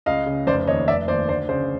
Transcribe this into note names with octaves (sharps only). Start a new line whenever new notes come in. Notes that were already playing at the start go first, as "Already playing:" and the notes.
C#2 D#5 F5
C#3
F1 C5 D5
D#2 C#5 D#5
F1 D5 E5
D#2 C5 D5
D2 C5 D5
C#3 C5 D5